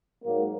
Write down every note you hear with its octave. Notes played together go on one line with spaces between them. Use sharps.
G#2 F#3 A#3